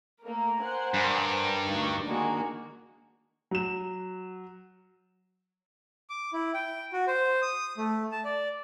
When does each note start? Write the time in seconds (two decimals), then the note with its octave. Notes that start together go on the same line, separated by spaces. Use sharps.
0.23 A3 A#3 A#4
0.61 C5 F#5 G#5
0.94 G2
1.66 D2 D#4 C#6
2.06 D#3 G#3 A#3 D4 F#4
3.51 F#3 E7
6.10 D6
6.33 E4
6.54 G5
6.93 F#4
7.07 C5
7.42 D#6
7.78 A3
8.12 A5
8.24 D5